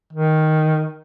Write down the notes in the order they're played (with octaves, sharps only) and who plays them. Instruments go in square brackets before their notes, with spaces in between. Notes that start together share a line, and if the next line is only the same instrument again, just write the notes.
[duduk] D#3